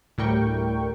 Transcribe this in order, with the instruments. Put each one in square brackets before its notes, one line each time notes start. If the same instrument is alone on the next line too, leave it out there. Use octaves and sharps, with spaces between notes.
[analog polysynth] D2 A2 G3 A#4 G5 C#6